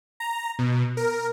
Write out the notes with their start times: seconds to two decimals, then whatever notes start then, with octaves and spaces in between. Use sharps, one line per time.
0.20 A#5
0.59 B2
0.97 A#4